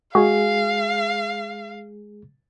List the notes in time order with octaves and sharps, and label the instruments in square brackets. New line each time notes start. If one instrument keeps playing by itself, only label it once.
[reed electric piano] G#3 G#4 [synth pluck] F#4 [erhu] F5